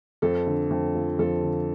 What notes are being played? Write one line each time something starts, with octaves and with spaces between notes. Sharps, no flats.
F2 A4
D3
F2
F3
F2 A4
D3